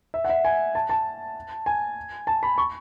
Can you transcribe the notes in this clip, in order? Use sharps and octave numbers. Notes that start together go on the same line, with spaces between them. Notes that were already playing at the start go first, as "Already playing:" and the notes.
E5
F#5
E5
G#5
A5
A5
G#5
A5
B5
C#6